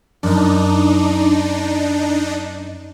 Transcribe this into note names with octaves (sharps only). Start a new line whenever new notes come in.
F#2 D4 D#4